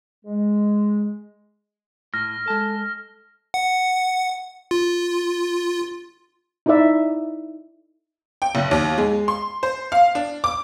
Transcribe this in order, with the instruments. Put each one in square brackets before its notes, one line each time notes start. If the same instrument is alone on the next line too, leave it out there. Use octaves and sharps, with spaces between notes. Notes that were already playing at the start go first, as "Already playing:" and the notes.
[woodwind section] G#3
[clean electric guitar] A2 [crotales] F6 A#6
[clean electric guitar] G#3 A5 [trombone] A4
[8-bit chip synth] F#5
F4
[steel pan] D#4 E4 A4 D5 E5
[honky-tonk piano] G5
F#1
D#2
G#3
C6
C5
F5
D4
D6